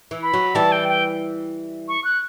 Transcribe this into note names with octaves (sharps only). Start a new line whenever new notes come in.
E3
B5
F#3
E3 G3 A5
G5
G5
C#6
F#6